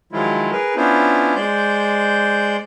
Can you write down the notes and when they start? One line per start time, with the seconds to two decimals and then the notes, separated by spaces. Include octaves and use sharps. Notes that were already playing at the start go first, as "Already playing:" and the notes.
0.13 D#3 F3 F#3 G#3 E4 F4
0.51 G#4 A#4 B4
0.76 B3 C#4 D4 E4 F4 C5
1.36 G#3 C5 D5 G6